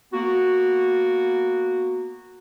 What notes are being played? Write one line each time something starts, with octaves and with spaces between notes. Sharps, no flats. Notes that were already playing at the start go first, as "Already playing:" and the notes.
A#3 B3 F#4